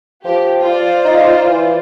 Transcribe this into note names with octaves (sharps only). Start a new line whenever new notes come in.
F3 G4
F4 C5 D5
D#4
E3